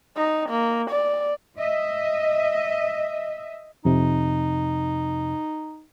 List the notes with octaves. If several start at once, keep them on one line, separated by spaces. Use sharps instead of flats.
D#4
A#3
D5
D#5 E5
F2 C3 D#4